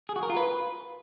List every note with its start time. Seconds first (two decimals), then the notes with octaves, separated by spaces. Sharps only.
0.09 G#4
0.16 F#4
0.23 A#4
0.30 F4
0.37 B4